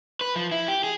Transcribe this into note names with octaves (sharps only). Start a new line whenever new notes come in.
B4
F3
E4
G4
G#4